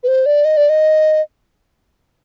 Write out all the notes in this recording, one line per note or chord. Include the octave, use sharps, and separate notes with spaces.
B4
C5
D5
D#5
D5
D#5